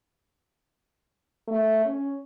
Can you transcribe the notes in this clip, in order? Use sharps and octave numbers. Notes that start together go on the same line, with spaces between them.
A3
C#4